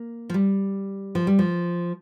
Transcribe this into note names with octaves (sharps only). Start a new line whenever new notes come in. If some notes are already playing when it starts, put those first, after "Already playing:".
Already playing: A#3
F3
G3
F3
G3
F3